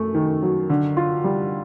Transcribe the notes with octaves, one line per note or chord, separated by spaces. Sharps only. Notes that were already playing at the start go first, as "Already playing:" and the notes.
Already playing: F#2 A3
D#3
F#3
D3
F4
G3